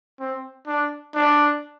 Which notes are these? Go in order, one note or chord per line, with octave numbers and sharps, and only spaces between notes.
C4
D4
D4